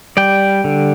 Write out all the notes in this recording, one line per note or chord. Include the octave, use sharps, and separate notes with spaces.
G3 D5 G5
D3